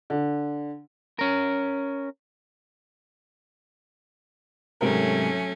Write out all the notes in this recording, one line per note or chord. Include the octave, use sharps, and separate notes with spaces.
D3
C#4 A#4
G#2 C3 F#3 A3 C#4 A#4